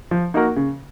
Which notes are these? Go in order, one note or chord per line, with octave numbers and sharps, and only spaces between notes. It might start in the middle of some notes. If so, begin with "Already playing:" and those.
F3
A#3 D#4 F#4 A#4
C#3